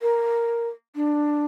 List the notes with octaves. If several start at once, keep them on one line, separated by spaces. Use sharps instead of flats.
A#4
D4